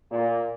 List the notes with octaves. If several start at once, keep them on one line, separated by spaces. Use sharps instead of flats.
A#2